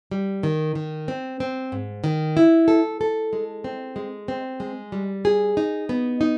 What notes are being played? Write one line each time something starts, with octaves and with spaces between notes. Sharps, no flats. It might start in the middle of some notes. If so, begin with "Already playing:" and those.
G3
D#3
D#3
C4
C4
G#2
D#3
E4
A4
A4
G#3
C4
G#3
C4
G#3
G3
G#4
D#4
B3
D#4